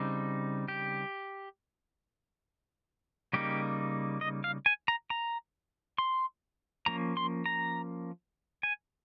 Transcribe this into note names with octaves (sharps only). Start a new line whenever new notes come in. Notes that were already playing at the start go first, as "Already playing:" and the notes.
Already playing: C#3 G3 C4 D#4
G4
C#3 G3 A#3 D#4 G4
D#5
F5
G#5
A#5
A#5
C6
F3 A#3 C#4 A#5
C6
A#5
G#5